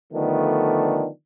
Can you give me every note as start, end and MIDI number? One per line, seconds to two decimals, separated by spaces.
0.13 1.07 50
0.13 1.07 51
0.13 1.07 53
0.13 1.07 57
0.13 1.07 59
0.13 1.07 62